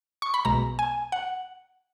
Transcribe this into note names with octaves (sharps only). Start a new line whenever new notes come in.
C#6
B5
B1 B2 G#3 A#5
G#5
F#5